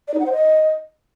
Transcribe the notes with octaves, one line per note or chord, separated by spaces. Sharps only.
D5
D#4
F#5
C5
D#5